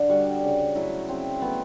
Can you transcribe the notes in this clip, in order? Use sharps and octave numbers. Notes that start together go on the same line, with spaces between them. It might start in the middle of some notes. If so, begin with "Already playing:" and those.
Already playing: D3
G3 F#4
C#3
F#3 A3 E4
C#3 C4
F#3 A3 B3